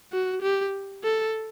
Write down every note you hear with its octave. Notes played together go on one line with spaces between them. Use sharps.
F#4
G4
A4